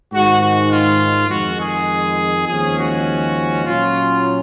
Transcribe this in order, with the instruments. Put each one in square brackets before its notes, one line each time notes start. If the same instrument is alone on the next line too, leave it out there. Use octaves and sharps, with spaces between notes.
[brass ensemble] G#2 D#3 G#3 F#4
F#4
F4
F2 D#3 G#3 F#4
G#4
D#2 C#3 F3 G#3 C#4 G#4
F#4
A#2 F#3 C#4 F4